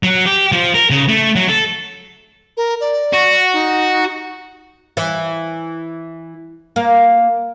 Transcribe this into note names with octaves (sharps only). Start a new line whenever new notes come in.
F#3
G4
F3
A#4
C#3
A3
F#3
A4
A#4
D5
F#4
D#4
E3
A#3